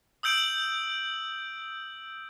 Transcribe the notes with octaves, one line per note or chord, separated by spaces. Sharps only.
D#6 E6 G6 D7 F#7